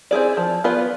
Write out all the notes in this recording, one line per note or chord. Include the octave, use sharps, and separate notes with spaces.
C4 E4 G#4 D5
F3
B3 F4 B4 D5